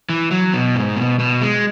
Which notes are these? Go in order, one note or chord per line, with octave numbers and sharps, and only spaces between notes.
E3
F#3
B2
G#2
B2
B2
G#3